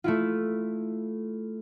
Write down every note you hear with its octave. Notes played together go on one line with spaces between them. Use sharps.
A3 E4 F4